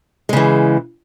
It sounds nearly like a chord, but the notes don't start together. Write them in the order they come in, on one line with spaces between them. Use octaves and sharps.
G#3 C#3 E3